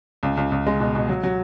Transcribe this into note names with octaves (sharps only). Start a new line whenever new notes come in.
C#2
C#2
C#2
G#3
B2
B2
F#3
F#3